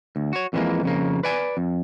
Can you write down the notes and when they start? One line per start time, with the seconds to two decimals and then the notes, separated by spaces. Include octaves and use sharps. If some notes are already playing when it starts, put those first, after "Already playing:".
0.16 D2
0.33 F#4 C#5
0.53 F2 D3 E3 G3 G#3 A#3
0.83 F2 C#3 A#3
1.23 B4 D5 G#5
1.57 F2